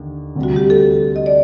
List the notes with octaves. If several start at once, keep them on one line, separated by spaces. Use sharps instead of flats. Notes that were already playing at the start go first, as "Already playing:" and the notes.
Already playing: D#2 D3
D2 C3 G3
F#4
G4
A4
D#5
D5